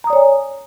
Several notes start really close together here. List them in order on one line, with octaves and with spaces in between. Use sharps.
A#5 D#6 D5 C#5 G#5